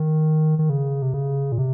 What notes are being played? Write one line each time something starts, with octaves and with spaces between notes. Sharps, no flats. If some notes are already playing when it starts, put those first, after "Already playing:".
Already playing: D#3
D#3
C#3
C3
C#3
A#2
C3